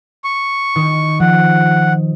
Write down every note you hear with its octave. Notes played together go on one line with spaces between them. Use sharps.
C#6
D#3
F3 F#5